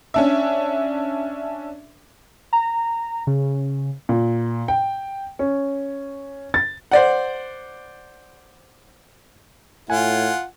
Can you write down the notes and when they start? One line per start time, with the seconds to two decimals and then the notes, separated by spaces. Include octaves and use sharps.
0.14 C#4 D4 E5
2.53 A#5
3.27 C#3
4.09 A#2
4.68 G5
5.39 C#4
6.54 A6
6.91 C5 D5 F#5
9.90 A2 F4 F#5 G#5